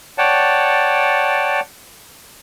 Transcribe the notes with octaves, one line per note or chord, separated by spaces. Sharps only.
C#5 D5 F#5 G5 A5